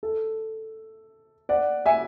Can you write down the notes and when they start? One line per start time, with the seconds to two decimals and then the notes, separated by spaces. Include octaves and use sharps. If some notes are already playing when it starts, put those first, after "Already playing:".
0.03 A4
1.49 D5 F#5
1.86 E5 G#5